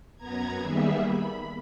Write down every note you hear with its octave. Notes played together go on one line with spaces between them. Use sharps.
F#2 B3 A#5 G#6
D#3 G3 A#3 B3 G#4 E5
B5